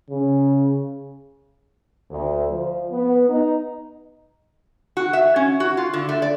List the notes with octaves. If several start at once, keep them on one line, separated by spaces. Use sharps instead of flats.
C#3
D2
F3
B3
D#4
F#4
E5
C#4
F#4
F4
D3
A3
D5